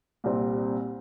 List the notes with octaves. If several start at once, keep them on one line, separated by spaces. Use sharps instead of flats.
C2 A#2 G3 C4